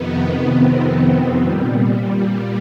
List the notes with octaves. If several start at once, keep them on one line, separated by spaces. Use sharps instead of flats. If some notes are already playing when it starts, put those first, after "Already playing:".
Already playing: F2 C3 D#3 B3
C4
A#2 G3